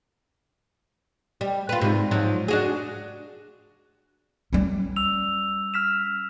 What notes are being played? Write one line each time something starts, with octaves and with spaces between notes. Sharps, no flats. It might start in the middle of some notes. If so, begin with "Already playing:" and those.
G3
F4 B4
G#2 C3
G#2 F3 F#3
D4 F#4 G#4
G3 C#4
E6 F7
F6 B6 E7